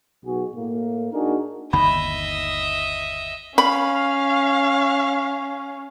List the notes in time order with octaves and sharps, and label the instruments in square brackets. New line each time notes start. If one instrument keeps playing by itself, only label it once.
[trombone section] B1 B2 F#4 G#4
A2 A#3
D4 D#4 F#4 G#4 A#4
[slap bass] G1 D#2 D#3 [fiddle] D#5 E5 [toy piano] B5
[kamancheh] C#4 [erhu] F5 [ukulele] B5